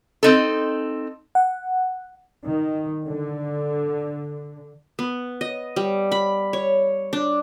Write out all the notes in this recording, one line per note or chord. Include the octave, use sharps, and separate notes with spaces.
C4 D#4 A4
F#5
D#3
D3
B3
D#5
G3
B5
C#5
D4